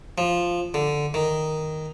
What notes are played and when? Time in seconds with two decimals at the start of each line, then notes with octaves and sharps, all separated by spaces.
0.18 F3
0.74 D3
1.14 D#3